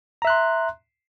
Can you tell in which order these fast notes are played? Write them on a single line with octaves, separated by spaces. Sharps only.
A#5 E5 F#6 C6